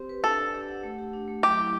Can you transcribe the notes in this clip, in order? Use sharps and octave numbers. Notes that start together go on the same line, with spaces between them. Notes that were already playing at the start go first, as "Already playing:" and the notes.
Already playing: C4 G4 C5
B4
D4 A4
D5
G4
F#5
A3
G4
D4
A3
F#3 G4
E4